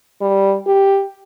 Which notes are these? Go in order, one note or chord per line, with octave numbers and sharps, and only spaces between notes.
G3
G4